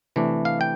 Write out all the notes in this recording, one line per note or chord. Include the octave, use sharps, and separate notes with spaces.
C3 E3 A3 D4
F5
G5